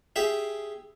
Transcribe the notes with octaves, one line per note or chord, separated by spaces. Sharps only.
G4 G#4 E5